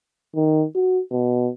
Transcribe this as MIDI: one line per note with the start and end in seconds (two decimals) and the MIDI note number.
0.35 0.66 51
0.75 1.01 66
1.11 1.51 47